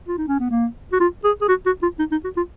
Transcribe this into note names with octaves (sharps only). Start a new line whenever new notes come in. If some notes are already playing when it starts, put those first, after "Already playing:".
F4
D#4
C#4
B3
A#3
F#4
F4
G#4
G#4
F#4
F#4
F4
D#4
D#4
F#4
F4